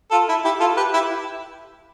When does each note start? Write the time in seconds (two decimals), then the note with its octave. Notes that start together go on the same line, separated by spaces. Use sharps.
0.11 F4 A4
0.29 E4
0.45 E4 G4
0.60 F4 A4
0.77 G4 B4
0.93 E4 G4